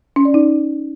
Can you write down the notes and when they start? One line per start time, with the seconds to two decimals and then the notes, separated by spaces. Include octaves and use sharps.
0.16 C#4
0.25 D5
0.34 D#4